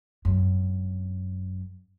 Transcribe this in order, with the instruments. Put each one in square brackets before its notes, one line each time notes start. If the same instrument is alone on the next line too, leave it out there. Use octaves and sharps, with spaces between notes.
[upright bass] G#1 F#2